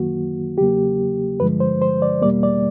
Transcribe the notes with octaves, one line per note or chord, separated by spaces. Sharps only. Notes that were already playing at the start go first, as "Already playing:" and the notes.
Already playing: F#2 D#3 F#3 A#3 F#4
E2 C#3 F#3 A#3 G4
G2 D3 F3 G#3 B4
C5
C5
D5
E2 B2 G3 A#3 D5
D5